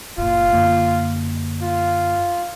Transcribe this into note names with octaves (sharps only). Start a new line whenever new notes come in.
F#1 A#2 F4
F#2 D3 A#3
F4